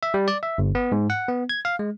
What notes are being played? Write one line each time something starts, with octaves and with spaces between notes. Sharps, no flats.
E5
G3
D5
E5
G1
B3
G#2
F#5
B3
G#6
F5
G#3